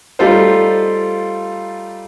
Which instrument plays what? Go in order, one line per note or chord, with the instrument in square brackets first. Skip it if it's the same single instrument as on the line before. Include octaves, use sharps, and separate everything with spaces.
[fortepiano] G3 A3 D#4 F4 A4 C5